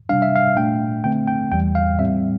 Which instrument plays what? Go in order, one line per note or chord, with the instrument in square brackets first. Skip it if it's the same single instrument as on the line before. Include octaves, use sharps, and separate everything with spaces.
[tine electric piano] C3 G3 D4 F5
E5
F5
A#2 A3 D4 G5
D3 A3 C4 G5
G5
E2 E3 G3 G5
F5
A2 G3 C4 E5